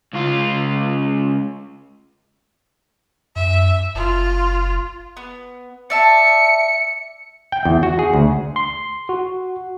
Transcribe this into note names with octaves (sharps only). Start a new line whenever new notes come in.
C#2 F4
F#2 E5
F#1 F4
B3
D5 E5 A5 C#7
G5
E2
F#4
G#4
D2
C6
F#4